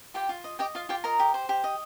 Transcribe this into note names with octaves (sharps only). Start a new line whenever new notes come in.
F4 G4 G5
F4
D#5
G4 D#5 G5
F4 F5
F4 G4 G5
A#4 D#5 A#5
G4
C5
G4
D#5